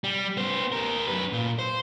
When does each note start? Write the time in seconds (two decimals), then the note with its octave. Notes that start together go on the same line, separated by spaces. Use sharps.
0.04 G3
0.37 B3 C5
0.72 G4 A#4
1.07 F#2 B4
1.33 A#2
1.59 C5